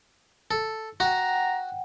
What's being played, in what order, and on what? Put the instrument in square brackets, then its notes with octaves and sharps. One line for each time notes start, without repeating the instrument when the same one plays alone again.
[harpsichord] A4
[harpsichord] F#4 [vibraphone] F#5 G5 [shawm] A#5